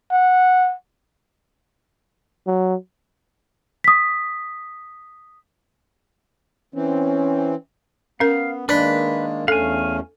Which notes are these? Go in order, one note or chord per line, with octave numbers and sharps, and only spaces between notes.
F#5
F#3
D#6 B6
E3 C4 C#4
B3 C#4 A#4 F5
D#3 G#3 A#3 D4 B4 B5
E2 A3 C#4 A4 F5 G#5